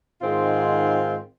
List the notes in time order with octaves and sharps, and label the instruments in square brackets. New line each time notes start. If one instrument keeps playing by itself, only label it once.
[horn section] G#2 D#3 G#3 C4 F4